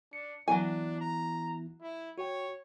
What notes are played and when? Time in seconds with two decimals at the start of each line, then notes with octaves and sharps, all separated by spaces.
0.13 D4 C#7
0.48 E3 F#3 B3 D4 E4 G#5
1.01 A#5
1.82 E4
2.18 F#4 C#5 G5